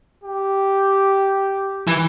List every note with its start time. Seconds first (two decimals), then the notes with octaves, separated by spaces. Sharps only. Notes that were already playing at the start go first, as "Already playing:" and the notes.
0.24 G4
1.87 E3